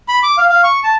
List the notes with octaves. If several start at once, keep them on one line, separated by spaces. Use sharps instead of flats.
B5
D6
F5
F5
C#6
A5